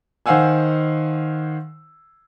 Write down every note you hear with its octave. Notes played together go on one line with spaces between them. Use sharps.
D#3 C5 F5 F#5 G#5 E6